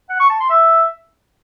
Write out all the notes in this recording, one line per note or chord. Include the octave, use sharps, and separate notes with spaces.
F#5
C#6
A5
C6
E5